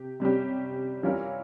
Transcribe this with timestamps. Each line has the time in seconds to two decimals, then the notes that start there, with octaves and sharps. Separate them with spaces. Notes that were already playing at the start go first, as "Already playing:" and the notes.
Already playing: C3 G4
0.20 C3 G3 C#4 G4
1.03 E3 G3 C#4 F4 A#4